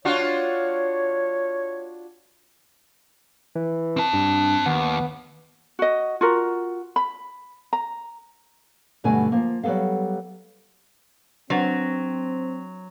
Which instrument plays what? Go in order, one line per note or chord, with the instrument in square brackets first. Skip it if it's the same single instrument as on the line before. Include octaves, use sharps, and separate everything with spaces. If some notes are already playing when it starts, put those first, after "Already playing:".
[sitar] D4 F4 F#4 [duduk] C#5
[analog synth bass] E3
[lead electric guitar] C4 A5
[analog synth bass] G2
[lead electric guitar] D#2 [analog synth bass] B3
[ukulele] F#4 D#5
F4 F#4 A#4
B5
A#5
[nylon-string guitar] G2 B2 D3 F#3 A3 G#5
F3 A#3
F#3 G3 B3 A4 F5
[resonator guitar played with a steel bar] F#3 [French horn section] C4 [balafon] D4 B4 F#5